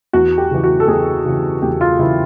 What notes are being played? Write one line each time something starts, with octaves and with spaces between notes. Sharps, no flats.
E2 F#4
G4
C#3 E3
F#4
A4
E2 G#4
C#3 E3
E2 G4
F4
C#3 E3 E4